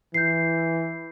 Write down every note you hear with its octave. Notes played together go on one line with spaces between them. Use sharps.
E3 G6 C7